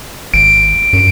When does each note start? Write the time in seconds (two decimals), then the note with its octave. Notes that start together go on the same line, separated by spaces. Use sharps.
0.34 G#1 D7
0.93 F#2